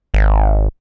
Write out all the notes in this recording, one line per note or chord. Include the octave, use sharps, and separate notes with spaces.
G#1